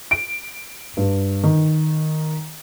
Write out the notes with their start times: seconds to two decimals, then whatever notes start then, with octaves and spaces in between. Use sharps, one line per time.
0.11 D7
0.97 G2
1.44 D#3